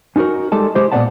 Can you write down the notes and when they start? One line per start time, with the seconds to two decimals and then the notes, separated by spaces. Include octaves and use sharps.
0.16 C#4 D#4 F4 F#4 A#4
0.52 G3 G#3 A4 A5
0.75 G#3 E4 G4 C5
0.92 A#2 B3 C5 D5 F#5 A5